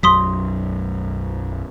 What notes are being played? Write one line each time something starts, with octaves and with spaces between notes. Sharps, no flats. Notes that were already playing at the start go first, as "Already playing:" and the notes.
B1 F#2 F#3 C6 D#6 B6